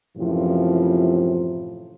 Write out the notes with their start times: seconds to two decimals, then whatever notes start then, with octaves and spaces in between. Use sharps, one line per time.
0.18 F#2 A2 C3 E3 F3